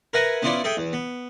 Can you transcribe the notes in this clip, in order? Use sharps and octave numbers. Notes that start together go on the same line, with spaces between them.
A#4 B4 E5 F#5 G#5 A#5
B3 C#4 E4 F4 C5 D5
G#4 A4 E5 G5
E2
B3